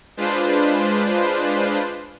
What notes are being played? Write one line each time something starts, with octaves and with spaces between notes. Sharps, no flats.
G#3 D4 F4 B4 C5